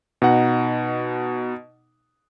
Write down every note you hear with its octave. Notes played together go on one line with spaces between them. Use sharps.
B2 D#4 F#5